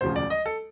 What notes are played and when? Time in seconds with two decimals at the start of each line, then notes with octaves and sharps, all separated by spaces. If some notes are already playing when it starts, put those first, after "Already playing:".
0.01 E1 D2 C#3 F3 C5
0.16 D5
0.30 D#5
0.46 A4